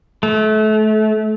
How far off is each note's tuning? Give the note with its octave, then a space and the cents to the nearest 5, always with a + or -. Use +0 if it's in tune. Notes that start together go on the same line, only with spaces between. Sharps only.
A3 -30